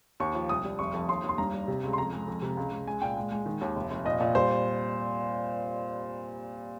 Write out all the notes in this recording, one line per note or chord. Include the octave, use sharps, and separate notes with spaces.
D#2 C#6
F3
C2 D#6
G3
F1 C#6
F2
D#2 C6
D#2
C6
G2 A#5
G3
C3
C#2
C6
F2 A#5
G#3
F2
C3
C#2
C#2
G#3 G#5
A#2 G5
G#3
G#3
D#3
D#2
F1
F1
A#2 D#5
A#2
G3 C5